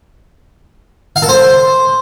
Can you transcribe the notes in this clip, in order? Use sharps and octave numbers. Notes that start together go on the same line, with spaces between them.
F5
A4
C5